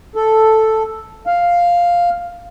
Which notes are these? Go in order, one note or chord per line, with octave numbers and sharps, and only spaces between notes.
A4
F5